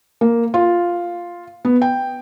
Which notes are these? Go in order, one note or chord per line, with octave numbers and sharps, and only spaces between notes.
A#3
F4
B3
G5